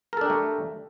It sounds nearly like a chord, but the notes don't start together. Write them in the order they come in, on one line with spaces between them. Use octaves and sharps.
A#4 A4 D4 G4 A3